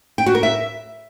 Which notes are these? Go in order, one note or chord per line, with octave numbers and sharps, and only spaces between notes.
G5
F#4
A#4
E5